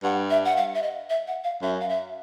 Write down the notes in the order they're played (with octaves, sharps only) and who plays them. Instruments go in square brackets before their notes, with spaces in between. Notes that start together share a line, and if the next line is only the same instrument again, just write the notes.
[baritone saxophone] G2 [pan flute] F#5
[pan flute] E5
F#5
F5
E5
D#5
E5
F#5
F5
[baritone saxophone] F#2 [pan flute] E5
[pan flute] F5
E5